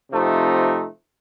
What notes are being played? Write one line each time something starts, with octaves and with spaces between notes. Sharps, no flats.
C3 F3 A3 C4 D#4